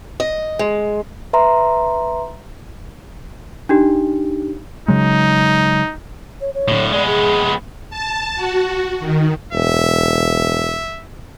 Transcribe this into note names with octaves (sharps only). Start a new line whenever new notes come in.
D#5
G#3
B4 E5 A#5 C6
D4 D#4 G4
C#3 F#3 G#3 D#4
C#5
C#5
A2 D3
G#3 B3 D5
G#4
A5
F#4
D#3
E1 E5